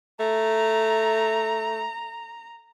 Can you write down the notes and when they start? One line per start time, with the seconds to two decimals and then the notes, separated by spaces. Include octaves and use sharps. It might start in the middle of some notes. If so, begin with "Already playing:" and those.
0.20 A3 A#5